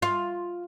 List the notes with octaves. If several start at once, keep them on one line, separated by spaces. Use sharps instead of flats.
F4